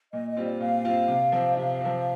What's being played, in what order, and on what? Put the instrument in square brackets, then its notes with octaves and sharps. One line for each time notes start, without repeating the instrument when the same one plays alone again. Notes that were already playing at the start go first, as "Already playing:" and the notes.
[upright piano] A#2 [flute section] D#5
[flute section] D#5
[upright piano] G3 C4 F4
[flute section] D5
[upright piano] A#2 [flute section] F5
[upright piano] G3 C4 F4
C3
F3 C4
[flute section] D#5
[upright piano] C3 [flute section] F5
[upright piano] F3 C4